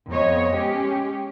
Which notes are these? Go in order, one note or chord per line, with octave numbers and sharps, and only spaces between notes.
F2 B3 C#5 D#5
G#3 C#4 G4